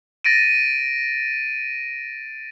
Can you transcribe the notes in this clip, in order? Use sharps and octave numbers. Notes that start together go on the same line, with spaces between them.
A6 A#6 D7 D#7